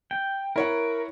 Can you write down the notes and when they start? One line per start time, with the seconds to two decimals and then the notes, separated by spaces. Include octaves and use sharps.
0.11 G5
0.56 E4 A#4 C#5 F#5